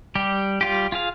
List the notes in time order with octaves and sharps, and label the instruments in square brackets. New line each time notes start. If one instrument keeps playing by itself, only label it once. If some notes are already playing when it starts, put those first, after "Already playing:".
[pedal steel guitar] G3 G4
G3 F4 G4
F4 G#4 F5